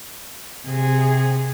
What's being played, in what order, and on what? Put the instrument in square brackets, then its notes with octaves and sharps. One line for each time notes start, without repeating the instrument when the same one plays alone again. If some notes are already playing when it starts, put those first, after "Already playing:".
[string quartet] C3 G#4